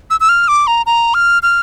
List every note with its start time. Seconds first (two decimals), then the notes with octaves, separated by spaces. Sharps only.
0.10 E6
0.20 E6
0.29 F6
0.48 D6
0.67 A#5
0.86 A#5
1.14 F6
1.43 F6